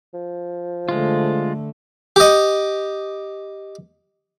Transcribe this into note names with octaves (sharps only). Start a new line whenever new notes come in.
F3
D3 G#3 A3 F4
G4 D#5